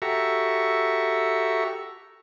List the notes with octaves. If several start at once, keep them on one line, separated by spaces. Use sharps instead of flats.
F#4 G4 A4 E5 A#5 C#6